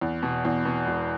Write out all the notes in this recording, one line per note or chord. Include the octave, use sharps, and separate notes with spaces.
E2
B2
E2
B2
E1